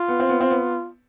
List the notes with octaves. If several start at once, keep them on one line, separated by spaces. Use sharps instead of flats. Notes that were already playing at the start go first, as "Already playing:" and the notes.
Already playing: F4
B3
C4
B3
C4
B3